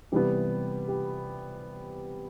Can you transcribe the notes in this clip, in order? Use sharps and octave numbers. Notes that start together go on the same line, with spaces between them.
C3 E3 G3 B3 G4
G4